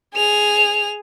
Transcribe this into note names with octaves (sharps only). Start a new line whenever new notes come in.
G#4 F7